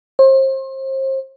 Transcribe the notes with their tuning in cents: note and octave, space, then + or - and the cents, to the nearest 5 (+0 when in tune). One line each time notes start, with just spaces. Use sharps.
C5 +35